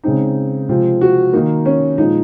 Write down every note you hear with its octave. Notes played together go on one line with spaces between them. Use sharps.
C#3 G#3 C4 D#4
C3 F3 G#3 C4 F4
F#4
D#3 A#3 D#4
C#4
A#2 F3 G#3 D#4